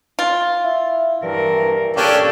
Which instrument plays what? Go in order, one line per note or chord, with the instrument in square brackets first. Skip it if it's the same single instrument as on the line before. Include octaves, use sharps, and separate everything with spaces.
[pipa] F4
[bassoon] E4
[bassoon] G2 [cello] E3 A#4
[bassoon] A#3 [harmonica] C#4 D4 G4 [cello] A4 D5